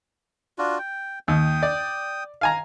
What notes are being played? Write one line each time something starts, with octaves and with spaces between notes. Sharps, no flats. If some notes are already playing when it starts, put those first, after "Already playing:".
D4 F4 F#4
G5
D#2 G5 D#6
D5
F5 G#5 A#5